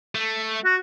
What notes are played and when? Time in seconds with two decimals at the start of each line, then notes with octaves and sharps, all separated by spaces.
0.15 A3
0.65 F#4